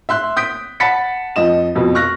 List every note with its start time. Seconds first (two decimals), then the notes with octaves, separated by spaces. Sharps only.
0.09 E5 C6 F#6
0.37 D#6 G6 B6 D7
0.80 F#5 A5 B5 A6 B6 C#7
1.36 F2 F3 D#5 E7
1.75 F2 B2
1.95 C#6 F6 F#6 A#6